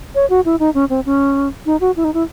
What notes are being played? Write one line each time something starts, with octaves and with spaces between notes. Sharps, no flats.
C#5
F#4
E4
D#4
C#4
C4
C#4
D#4
F#4
E4
D#4
E4